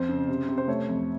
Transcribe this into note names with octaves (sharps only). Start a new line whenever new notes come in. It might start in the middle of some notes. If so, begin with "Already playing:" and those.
Already playing: F2 C4 C5
C#3
C3
C3
C5
A3 C#5
F2